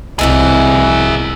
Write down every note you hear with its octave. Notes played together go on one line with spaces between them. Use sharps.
C2 B2 E3 F#3 G#4 E5